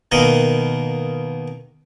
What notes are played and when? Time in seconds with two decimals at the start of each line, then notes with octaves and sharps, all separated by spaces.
0.12 B2 D#3 A#3 D#5 D#6